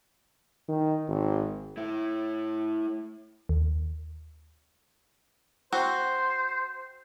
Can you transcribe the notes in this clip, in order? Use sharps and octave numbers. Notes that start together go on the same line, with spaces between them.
D#3
G#1
A3 E4
D#2
C4 F#4 C5